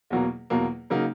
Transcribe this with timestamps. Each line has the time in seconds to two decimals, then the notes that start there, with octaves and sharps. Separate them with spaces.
0.10 E2 B2 F#3 A#3
0.50 E2 B2 F#3 A#3
0.90 C#3 F#3 A#3 D#4